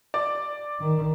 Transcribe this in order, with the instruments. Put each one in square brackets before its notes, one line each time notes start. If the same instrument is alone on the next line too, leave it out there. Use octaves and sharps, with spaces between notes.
[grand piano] D5
[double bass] D#3